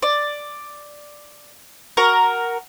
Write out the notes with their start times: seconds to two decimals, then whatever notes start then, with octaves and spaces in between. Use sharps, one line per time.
0.02 D5
1.97 F#4 A#4 A#5